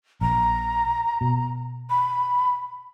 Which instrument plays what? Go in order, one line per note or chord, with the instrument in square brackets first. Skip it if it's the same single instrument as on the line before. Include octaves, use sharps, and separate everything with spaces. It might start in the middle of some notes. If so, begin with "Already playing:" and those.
[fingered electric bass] A#1 [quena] A#5
[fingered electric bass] B2
[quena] B5